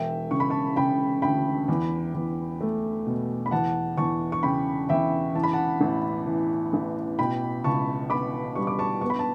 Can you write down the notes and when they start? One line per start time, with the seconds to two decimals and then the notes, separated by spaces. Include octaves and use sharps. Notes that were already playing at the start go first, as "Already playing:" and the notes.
Already playing: E1 E5 G5
0.31 C#3 C#6
0.40 B5
0.50 A5 C#6
0.76 C#3 G5 B5
1.22 D2 G5 B5
1.68 E2
2.14 E2
2.61 A3
3.06 B2
3.46 B5
3.51 E2 F#5 A5
3.98 E2 A5 C#6
4.32 C#6
4.43 C#3 G5 B5
4.89 E2 E5 G5
5.35 E3 A5
5.43 B5
5.53 F#5 A5
5.81 A1
6.26 E3
6.73 A1
7.19 B2 G5 B5
7.64 C#2 A5 C#6
8.10 B3 B5 D6
8.55 G3 C#6
8.67 D6
8.79 A5 C#6
9.01 B3 C#6
9.10 B5
9.19 A5